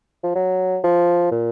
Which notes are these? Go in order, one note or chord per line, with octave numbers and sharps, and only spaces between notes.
F3
F#3
F3
A#2